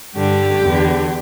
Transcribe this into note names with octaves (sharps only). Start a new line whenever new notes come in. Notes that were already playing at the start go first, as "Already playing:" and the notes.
G2 D3 G4
E2 D3